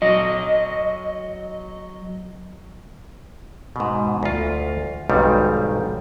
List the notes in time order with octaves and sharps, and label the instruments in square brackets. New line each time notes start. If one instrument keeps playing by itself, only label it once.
[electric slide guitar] F#3 D#5
[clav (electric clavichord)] G#2 B2
D2 F4
B1 F2 G#2 D#3 G3